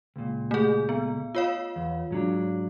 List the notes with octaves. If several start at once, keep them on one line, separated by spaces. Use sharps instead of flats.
C#2 A#2
A3 G#4
B3
F4 C#5 F5
E2
G#2 F#3 D4